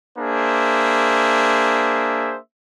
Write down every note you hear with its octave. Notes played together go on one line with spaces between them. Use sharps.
A#3 D4 G#4 C5 E5